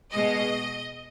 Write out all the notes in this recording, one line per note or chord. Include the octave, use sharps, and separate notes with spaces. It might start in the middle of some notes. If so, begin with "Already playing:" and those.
B2 G#3 D#5